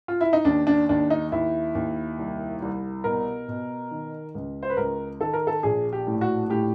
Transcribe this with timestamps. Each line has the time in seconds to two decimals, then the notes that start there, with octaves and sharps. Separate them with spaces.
0.08 F4
0.21 E4
0.33 D#4
0.45 D#2 D4
0.67 D4
0.89 D#2 D4
1.10 D#4
1.32 D#2 E4
1.75 D#2
2.18 C2
2.62 C2
3.04 B2 A#4
3.48 B2
3.91 D#3
4.35 C#2
4.63 C5
4.70 B4
4.77 C#2 A#4
5.20 D#3 A4
5.33 A#4
5.47 A4
5.63 A#1 G#4
5.93 G4
6.07 A2
6.21 F#4
6.50 A2 G4